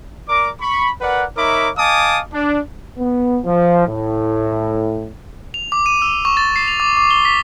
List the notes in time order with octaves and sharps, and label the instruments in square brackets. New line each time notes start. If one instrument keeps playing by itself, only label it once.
[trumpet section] A#4 D5 A#5 D6
B5 C#6
A#4 B4 D5 F#5
D#4 A#4 C#5 E5 B5 D6
D#5 F5 G#5 A5 D6 D#6
D4
[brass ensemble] B3
F3
A2
[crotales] F7
D6
D#7
E6
C#6
A6
C7
F7
D6
D6
G7
B6